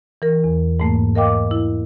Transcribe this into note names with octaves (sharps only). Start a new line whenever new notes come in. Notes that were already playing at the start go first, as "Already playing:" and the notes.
E3 A#4
E2
G#2 A3 A#3
A#4 D#5 F5 G5 D6
E4